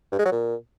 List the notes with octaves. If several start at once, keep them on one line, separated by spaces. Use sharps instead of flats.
G2
G#3
F#3
A#2